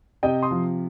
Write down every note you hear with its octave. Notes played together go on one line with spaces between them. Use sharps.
C3 D#5 G5
C6 D#6
F3